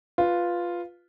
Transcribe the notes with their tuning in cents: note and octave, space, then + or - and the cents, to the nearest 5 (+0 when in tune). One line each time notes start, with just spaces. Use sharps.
F4 +0 B4 +0